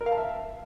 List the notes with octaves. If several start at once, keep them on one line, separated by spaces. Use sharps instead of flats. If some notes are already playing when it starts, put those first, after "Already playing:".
A#4
F5
A5
E5